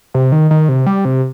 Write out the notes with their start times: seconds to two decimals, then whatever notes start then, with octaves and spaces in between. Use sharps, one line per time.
0.14 C3
0.32 D#3
0.51 D#3
0.69 C3
0.86 G3
1.05 C3